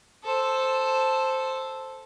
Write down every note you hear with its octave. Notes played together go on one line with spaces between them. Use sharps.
A4 C5